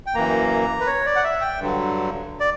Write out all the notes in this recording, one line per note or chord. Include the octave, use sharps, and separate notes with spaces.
G5
F#2 E3 A#3 A#5
B4
C#5
D5
F#5
E5
G5
G2 D3 F#3
D5